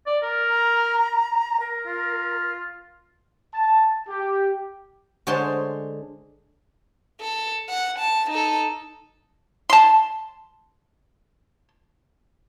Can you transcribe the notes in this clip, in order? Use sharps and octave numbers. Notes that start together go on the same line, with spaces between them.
D5
A#4 D5
A#5
A#4
F4
A5
G4
D3 G#3 C5 C#5 A5 C6
A4
F#5
A5
D#4 A4
A5 C6